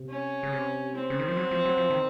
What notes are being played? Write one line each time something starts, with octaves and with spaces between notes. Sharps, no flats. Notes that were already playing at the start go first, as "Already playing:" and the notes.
Already playing: C3
C#4
C#3
C3
C4
C#3
D#3
F3
F#3
F3
F#3
F3
D#3